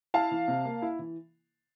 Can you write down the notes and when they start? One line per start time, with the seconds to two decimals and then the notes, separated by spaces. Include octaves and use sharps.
0.14 E4 F5 A5
0.31 E3
0.48 C3
0.65 A#3
0.82 E4
0.99 E3